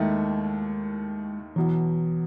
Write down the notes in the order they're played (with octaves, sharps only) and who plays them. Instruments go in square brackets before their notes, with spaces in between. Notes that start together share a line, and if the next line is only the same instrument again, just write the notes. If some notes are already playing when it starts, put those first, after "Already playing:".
Already playing: [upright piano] D#2 D#3 A3 E4 [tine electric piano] G#3
[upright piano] E2 B2 F#3 [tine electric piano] E3